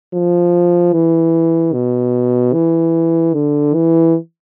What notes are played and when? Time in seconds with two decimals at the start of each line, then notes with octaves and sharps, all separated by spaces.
0.13 F3
0.93 E3
1.73 B2
2.53 E3
3.34 D3
3.74 E3